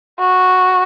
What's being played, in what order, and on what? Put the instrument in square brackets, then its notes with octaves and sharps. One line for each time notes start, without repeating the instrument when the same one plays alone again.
[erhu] F#4